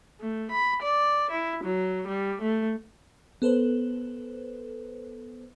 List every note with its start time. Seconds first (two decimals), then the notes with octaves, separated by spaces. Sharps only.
0.20 A3
0.51 B5
0.82 D5
1.31 E4
1.64 F#3
2.07 G3
2.42 A3
3.42 B3 A4 B4 C5